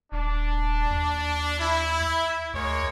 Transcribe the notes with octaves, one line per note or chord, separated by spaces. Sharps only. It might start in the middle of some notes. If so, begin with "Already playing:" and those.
D#1 D4
D#2
E4
D2 G#3 A#3 C#5